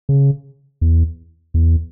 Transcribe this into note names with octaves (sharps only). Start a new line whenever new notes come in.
C#3
E2
E2